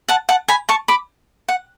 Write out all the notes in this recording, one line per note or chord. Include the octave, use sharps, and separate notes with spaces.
F#5 A5
F#5 A5
G#5 B5
A5 C#6
B5 D6
F#5